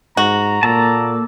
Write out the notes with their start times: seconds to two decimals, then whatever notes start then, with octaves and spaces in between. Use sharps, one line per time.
0.17 G#2 F#4 A#5
0.63 A#2 A#3 A4 A5